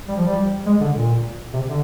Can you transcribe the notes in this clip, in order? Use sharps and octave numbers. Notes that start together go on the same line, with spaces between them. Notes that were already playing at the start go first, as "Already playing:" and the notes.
G3
F3
G3
G#3
D3
A#2
C3
D3